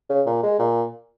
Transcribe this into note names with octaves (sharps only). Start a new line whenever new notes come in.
C#3
A#2
G#3
A#2